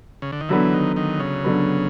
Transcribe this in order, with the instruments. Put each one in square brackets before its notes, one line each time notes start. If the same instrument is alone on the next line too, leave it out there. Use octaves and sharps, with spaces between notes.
[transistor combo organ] C#3
D3
D#3
[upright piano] D3 F#3 B3 [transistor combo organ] E3
[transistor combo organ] D#3
D#3
C#3
[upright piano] D3 F#3 B3